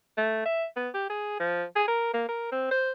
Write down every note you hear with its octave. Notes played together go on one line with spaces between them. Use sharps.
A3
E5
B3
G4
G#4
F3
G#4
A#4
A#3
A#4
C4
C5